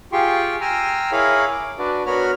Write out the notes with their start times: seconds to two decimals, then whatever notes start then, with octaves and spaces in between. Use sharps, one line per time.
0.12 F4 G4 G#4 G5 C6 C#6
0.61 G5 G#5 A#5 C6 E6 F6
1.12 E4 G#4 A#4 C#5 F5 B5
1.52 D6
1.79 D4 F#4 B4 D5
2.06 B3 F#4 A#4 C#5 B5 F6